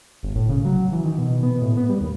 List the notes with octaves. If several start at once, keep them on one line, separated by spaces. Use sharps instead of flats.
G1
A2
C#3
F#3
E3
D#3
B2
B3
A2
B3
G3
D#2